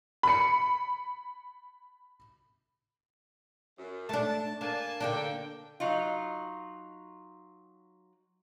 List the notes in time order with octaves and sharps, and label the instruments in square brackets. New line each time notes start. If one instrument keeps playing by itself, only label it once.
[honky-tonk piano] B5 C#7
[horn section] F#2
[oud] A3 D4 [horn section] A5
[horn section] A#3 G#5 A5 [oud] D4
[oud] D3 A#3 D4 [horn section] G5
[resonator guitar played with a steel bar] F#3 D#4 F4